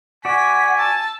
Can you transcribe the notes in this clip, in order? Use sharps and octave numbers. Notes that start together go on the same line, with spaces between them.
F#4 D5 F#5 G#5 B6
A5 E6